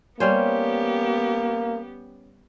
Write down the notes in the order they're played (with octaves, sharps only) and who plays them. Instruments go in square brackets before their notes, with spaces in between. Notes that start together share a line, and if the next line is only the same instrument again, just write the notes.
[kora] G3 C#4 C5 [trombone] A#3 [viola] B3 G4